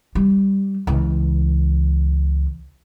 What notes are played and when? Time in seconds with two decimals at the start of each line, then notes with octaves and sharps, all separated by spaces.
0.15 G3
0.87 C#2 E3